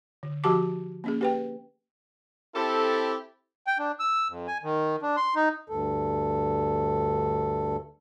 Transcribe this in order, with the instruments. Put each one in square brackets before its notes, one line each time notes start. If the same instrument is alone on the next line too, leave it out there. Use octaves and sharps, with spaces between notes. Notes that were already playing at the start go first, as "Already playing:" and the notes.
[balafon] D3
F3 F#4 G4 A5 D6
A#3 C#4 G#4
G4 B4 G5
[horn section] C4 E4 G4 A4
[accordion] G5
D4
E6
F2
G#5
D#3
D4
C6
D#4
D2 G2 A4